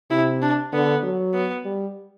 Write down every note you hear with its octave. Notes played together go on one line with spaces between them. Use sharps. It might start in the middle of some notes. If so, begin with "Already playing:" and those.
C3 E4
D4
D3 B3
F#3
B3
G3